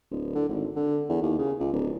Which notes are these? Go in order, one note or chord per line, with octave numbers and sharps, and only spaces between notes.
D1
D3
G#1
D3
E2
D#2
C#3
C#2
D1